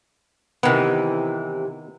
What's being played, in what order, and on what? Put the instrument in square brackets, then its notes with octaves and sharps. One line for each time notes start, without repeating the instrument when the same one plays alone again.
[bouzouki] C3 E3 [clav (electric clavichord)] D#3 B3